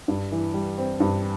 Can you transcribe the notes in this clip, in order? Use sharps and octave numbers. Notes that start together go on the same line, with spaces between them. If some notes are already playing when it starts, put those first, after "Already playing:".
G2
E3
G3
C4
G2